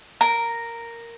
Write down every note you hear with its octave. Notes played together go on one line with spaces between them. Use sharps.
A#4